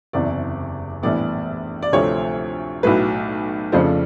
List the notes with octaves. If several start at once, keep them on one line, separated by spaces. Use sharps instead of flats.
F#1 E2 C3 D5
A#1 A2 E3 G3 B3 D5
D5
D2 C3 F3 A3 C4 C#5
B1 A2 F#3 B4
F2 C#3 F3 A3 D4 C5